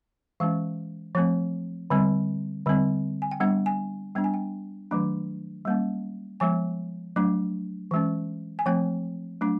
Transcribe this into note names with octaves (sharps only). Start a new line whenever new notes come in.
E3 G#3 C#4 F5
F3 A3 C4
D3 G3 C4
D3 G3 C4
G#5
G5
G3 B3 D4 F#5
G#5
G3 B3 D4 G5
G#5
G5
D#3 F#3 A3 D4
G3 A#3 C#4
F3 G#3 B3 G#5
F#3 A3 D4
E3 G#3 C#4
G#5
F3 A3 C4 G5
F#3 A3 D4